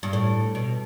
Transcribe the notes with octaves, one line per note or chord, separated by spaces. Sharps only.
G2
A2
B2